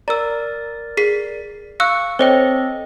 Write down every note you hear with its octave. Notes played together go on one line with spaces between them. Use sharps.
A#4 D5 A#5 E6
G#4 B6 C7
F5 C#6 E6 F#6 C#7
C4 A4 C5 C#5 D#5 G5